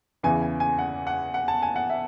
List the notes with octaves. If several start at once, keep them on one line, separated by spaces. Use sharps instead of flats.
E2 C#3 E3 G#5
G#5
G#5
F#5
F#5
F#5
A5
G#5
F#5
E5